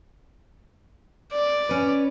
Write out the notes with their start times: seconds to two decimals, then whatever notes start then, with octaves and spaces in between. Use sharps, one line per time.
1.32 D5
1.69 C#4 B4